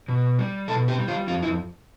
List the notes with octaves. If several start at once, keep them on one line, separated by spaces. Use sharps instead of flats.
B2
G3
B2 A4
G4
G3
F4
F2 F4
E4